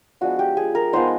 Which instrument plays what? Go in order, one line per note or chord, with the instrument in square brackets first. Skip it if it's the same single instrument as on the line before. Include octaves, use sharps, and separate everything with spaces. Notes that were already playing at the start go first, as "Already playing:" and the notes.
[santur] F3 G#3 B3 D4 F#4
G4
G#4
A#4
F3 G#3 B3 D#4 C5